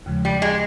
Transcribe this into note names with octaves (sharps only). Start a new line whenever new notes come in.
D#2 C#3 F3 G#3
G3
G#3